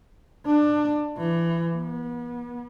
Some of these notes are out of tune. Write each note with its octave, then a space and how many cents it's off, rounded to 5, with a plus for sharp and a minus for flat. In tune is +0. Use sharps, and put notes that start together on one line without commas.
D4 +20
E3 +25
B3 -35